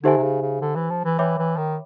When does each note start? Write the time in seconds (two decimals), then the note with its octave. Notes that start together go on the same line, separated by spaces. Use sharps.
0.03 D3 D#4 G4 C5 E5 G#5
0.17 C3
0.23 C#3
0.42 C#3
0.62 D3
0.76 E3
0.90 F3
1.05 E3
1.19 E3 C#5 E5 G5 B5 D6
1.38 E3
1.57 D#3